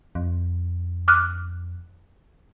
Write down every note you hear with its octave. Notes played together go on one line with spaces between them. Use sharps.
F2
D6 F6 F#6